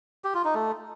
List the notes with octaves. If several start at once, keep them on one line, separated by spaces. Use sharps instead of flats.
G4
F4
D#4
A3